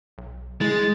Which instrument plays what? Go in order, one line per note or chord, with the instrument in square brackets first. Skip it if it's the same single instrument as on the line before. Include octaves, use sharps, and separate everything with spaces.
[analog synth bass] B1
[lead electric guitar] G#3 [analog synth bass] E4 [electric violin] A6